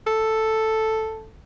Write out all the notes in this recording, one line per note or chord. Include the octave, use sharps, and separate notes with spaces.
A4